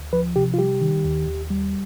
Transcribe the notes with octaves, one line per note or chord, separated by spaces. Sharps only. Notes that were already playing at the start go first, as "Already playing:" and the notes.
Already playing: D2
F3 B4
C3 G4
F4
G3 G4
D#3
D#2
D#2
G3